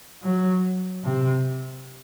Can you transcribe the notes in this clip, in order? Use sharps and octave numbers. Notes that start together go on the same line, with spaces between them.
F#3
C3